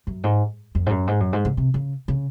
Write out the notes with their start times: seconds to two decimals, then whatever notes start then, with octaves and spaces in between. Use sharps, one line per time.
0.07 F#2
0.24 G#2
0.75 F2
0.86 G#2
0.91 F#2
1.07 G#2
1.20 F#2
1.33 G#2
1.45 C#3
1.57 C3
1.74 C#3
2.08 C#3